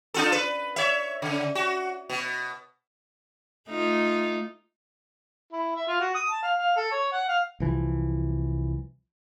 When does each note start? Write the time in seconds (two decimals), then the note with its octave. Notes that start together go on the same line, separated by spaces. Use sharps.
0.14 D4 F4 A4
0.32 B4
0.76 C#5 E5
1.22 C#3
1.55 F#4
2.10 B2
3.69 A3 D#4 F4
5.52 E4
5.76 E5
5.88 F4
6.00 F#4
6.15 D#6
6.30 A5
6.43 F5
6.58 F5
6.76 A4
6.91 C#5
7.12 F#5
7.28 F5
7.60 C2 E3 F3